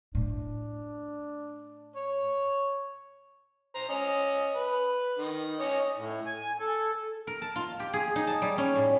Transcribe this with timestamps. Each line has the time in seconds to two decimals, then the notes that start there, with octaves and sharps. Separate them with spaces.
0.15 A2 D4
1.95 C#5
3.75 C5 A#5
3.89 C#4 D#5
4.55 B4
5.19 D#3
5.60 C#4 C#5 D#5
5.96 A2
6.26 G#5
6.60 A4
7.27 A#4
7.42 A5
7.56 F4
7.80 G4
7.93 G#4
8.16 D#4
8.27 A5
8.42 G3
8.58 C#4
8.76 A2